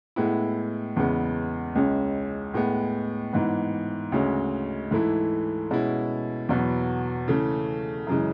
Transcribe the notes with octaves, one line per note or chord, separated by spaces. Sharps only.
A2 G#3 B3 E4
E2 C#3 G#3 B3
C#2 C#3 G#3 C#4
A2 G#3 B3
G#2 E3 B3
D2 C#3 G#3 C#4
G#2 E3 A3 E4
B2 G#3 C#4 E4
E2 B2 F#3 B3
C#3 E3 A3
F#2 C#3 E3 G#3